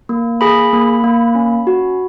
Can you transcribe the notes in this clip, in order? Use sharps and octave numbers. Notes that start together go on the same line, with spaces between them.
A#3
G#4 B5
A#3
A#3
C#4
F#4